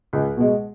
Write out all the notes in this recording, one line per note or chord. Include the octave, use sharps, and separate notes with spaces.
C#2
B2 G#3